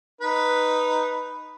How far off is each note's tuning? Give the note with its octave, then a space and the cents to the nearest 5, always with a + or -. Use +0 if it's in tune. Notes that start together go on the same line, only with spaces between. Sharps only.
D#4 +0 B4 +0